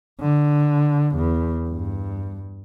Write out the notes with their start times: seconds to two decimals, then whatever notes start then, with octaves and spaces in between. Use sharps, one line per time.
0.21 D3
1.16 E2
1.68 G2